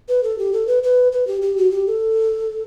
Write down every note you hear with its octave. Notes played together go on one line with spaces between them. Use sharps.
B4
A4
G4
A4
B4
B4
B4
G4
G4
F#4
G4
A4